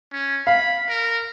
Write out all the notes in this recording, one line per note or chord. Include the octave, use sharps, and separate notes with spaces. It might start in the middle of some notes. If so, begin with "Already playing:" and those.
C#4
F5 B5
A#4